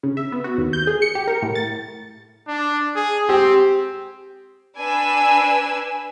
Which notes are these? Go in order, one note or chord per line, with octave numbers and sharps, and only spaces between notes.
C#3
E5
B3
F#4
D#2
G6
G#4
C#7
G4
A#4
A2
A6
D4
G#4
C4 G4
D4 B4 G#5 E6